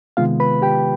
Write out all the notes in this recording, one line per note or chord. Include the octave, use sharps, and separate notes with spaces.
C3 D#3 G#3 B3 F4 F5
B4 B5
G4 G5